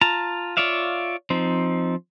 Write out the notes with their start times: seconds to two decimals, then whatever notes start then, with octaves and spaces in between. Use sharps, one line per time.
0.01 F4 A5 A#5
0.57 F4 C#5 D5 E5 F5
1.30 F3 C4 D#4